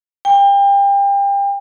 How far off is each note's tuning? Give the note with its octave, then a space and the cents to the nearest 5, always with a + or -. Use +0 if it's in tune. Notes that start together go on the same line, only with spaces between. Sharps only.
G5 +30